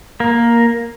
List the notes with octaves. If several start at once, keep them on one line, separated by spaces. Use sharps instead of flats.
A#3